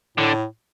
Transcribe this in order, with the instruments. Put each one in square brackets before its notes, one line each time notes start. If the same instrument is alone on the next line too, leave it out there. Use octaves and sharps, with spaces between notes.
[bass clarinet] A2 [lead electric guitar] D3